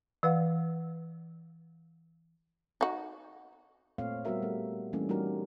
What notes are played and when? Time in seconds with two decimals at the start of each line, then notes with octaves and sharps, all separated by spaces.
0.23 E3 B4 F5 F#5
2.81 D#4 F#4
3.98 A#2 A3 C4 C#5 F5
4.25 G3 B3 F#4 A#4 E5
4.42 A3
4.93 E3 G3 A3 A#3 C#4 D4
5.09 G3 D#4 F#4 G4 A#4